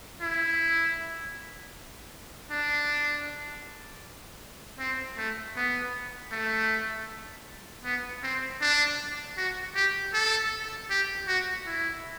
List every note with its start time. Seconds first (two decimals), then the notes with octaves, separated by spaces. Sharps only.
0.21 E4
2.51 D4
4.79 C4
5.17 A3
5.56 B3
6.32 A3
7.85 B3
8.23 C4
8.61 D4
9.37 F#4
9.75 G4
10.14 A4
10.90 G4
11.28 F#4
11.66 E4